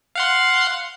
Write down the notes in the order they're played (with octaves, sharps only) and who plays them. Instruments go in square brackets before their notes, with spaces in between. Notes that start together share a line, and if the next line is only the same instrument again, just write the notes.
[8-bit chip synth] F5 F#5 C6